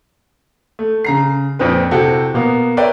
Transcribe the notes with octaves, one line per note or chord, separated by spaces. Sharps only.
A3
C#3 A#5 C7
F2 A#2 C4 B4
C3 C4 E4 F#4 G4 A4
B2 A#3 B3
A#4 B4 C#5 D5 E5 G5